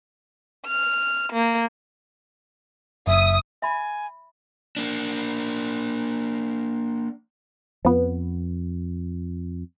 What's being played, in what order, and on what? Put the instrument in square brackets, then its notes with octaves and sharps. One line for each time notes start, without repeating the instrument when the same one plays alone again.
[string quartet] F6
A#3
[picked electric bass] F#1 [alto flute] E5 [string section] D#6
[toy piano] E5 B5 [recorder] G#5
[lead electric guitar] A#3 D4
[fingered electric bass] F2 [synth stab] F3 B3